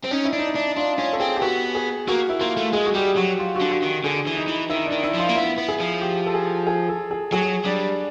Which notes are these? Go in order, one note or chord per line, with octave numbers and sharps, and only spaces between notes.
C4
C#4 D#4
E4
D4
D#4
D4
D4 F4
C#4 F4
A4
C4 G#4
G4
B3 F#4
G#4
A#3 F#4
E4
A#3 F4
A3
G#3 G#4
F#4
G3 G4
F#3 F#4
F4
F#4
D3
F#4
D#3
D3 G#4
E3
D#4
E3
D#3 E4
D4
D#3
E4
F3
F4
A#3
B3 E4
B3
G#4
F3
G4
A4
G#4
G#4
A4
G#4
F#3 G#4
G3 D4